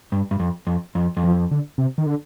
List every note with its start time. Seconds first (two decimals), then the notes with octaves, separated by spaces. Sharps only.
0.12 G2
0.31 G2
0.40 F2
0.67 F2
0.95 F2
1.17 F2
1.23 F3
1.51 D3
1.78 C3
1.98 D#3
2.06 D3